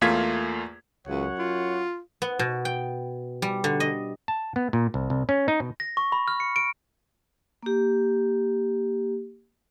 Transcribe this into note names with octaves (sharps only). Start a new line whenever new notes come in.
E2 A3 A#3 F4 G#6 B6
C#2 F#2 C#5 F#5
F4
B3
B2
G5
G3
D3
D#5
A5
B3
A#2
C2
C2
C#4
D#4
B2
A#6
C#6
B5
F6
C#7
D7
A#3 G4